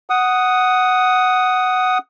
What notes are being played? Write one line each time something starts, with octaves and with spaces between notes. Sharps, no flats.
F#5 D#6